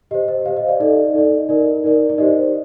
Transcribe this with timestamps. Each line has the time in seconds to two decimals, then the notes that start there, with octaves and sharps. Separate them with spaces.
0.11 G4 D#5
0.14 C5
0.28 D#5
0.46 G4 F5
0.48 C5
0.57 D#5
0.69 D5
0.80 D#4 A4 D5 D#5
1.14 D#4 A4 D5
1.49 D#4 A#4 D5
1.84 D#4 A#4 D5
2.09 D5
2.18 D#4 G4 C5 D#5